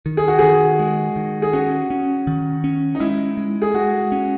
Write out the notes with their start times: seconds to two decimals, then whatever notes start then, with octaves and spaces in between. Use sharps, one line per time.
0.06 D#3
0.17 G#4
0.28 F#4
0.39 D#3 G#4
0.79 G#3
1.16 D#3
1.42 G#4
1.53 C#4 F#4
1.90 C#4
2.27 D#3
2.64 C#4
2.95 D#4
3.00 G#3 E4
3.37 G#3
3.62 G#4
3.74 G#3 F#4
4.12 C#4